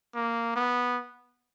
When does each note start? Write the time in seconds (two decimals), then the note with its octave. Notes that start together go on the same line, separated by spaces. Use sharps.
0.15 A#3
0.55 B3